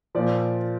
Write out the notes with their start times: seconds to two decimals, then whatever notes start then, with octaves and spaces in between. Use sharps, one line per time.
0.15 A#2 F3 D5